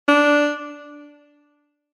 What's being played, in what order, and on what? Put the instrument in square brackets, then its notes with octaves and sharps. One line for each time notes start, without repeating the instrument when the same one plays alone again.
[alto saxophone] D4